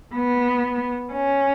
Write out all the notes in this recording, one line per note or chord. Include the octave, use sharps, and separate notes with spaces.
B3
C#4